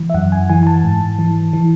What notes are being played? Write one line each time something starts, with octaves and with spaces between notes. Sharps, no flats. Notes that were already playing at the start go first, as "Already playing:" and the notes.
Already playing: E3
E5
F#2 F#5
G#5
E3 G#5
G#5
A5
G#2
E3
E3